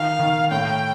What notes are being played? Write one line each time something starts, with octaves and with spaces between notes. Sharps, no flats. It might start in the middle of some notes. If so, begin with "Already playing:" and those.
Already playing: D#3 F5
D#3
A2 G5